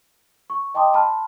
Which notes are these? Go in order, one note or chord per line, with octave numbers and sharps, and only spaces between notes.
C#6
D#5 G5 A5 C6 D6 D#6
A5 B5 C6 F6